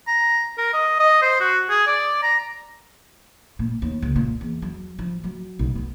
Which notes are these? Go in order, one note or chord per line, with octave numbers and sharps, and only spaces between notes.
A#5
A#4
D#5
D#5
C5
F#4
G#4
D5
A#5
A#2
D#2
C#2
A#2
E2
F#3
F3
F#3
B1
B3